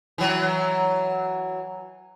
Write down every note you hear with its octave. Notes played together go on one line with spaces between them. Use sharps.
E3 F#3